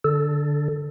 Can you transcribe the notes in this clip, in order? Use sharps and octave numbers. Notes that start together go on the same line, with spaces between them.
D3 A4